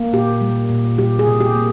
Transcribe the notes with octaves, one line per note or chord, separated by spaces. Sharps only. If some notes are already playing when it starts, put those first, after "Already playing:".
Already playing: A#3
A#2 G4
G3
A#2
G3 G4
G#4
C3
G4
A#3